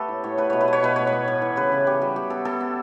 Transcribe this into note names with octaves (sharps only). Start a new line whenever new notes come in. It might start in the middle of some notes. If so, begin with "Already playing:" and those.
Already playing: A3 B3 G4 A4 B4
A2
A2 C#5
A3 B4
B2 C#5
B4
A3 C#5
B2 B4
A2 C#5
B3 B4
A2
E3
C#3 B4
C#3
B3 G4
G3 F#4
B3 G4
B3 A4
B3 A4
B3